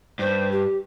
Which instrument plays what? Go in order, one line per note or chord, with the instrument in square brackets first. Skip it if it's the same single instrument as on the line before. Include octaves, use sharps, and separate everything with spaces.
[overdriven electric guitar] G2 [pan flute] C5
[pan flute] G4